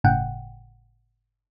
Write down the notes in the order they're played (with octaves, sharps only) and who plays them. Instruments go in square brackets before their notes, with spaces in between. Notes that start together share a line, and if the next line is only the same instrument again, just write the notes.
[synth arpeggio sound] G1 A2 C#3 F#5 G5